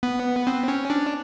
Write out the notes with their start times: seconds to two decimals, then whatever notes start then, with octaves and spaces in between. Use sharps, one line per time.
0.03 B3
0.47 C4
0.68 C#4
0.90 D4